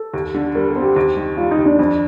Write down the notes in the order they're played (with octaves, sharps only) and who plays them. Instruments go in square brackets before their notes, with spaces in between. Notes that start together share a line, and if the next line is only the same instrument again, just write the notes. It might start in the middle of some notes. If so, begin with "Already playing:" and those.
Already playing: [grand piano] A4
[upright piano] D#2
D3
[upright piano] G3 [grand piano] A#4
[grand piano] A4
[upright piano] C4
[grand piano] G4
[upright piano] D#2
D#3
[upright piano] G3 [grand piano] F4
[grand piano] D#4
[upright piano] D#2
[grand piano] D4
[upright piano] F2